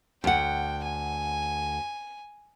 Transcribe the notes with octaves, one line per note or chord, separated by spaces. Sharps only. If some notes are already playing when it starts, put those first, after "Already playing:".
D2 F#5 G5
G#5